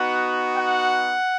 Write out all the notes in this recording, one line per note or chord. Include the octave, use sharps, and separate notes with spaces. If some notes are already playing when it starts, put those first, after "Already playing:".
Already playing: B3 D#4 F#4 F#5
F#5